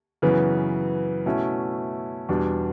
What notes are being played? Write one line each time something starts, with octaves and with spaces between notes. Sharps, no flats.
F#2 C#3 E3 B3
B2 A3 C#4 E4
E2 B2 G3 D4